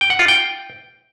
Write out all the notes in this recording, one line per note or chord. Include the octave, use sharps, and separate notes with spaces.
G5
F#5
F4
G5